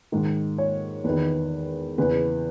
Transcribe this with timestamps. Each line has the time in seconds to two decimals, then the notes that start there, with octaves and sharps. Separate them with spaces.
0.12 G#2 D#3
0.58 C#5
1.04 E2 D#3 B4
1.98 E2 C#3 E3 B4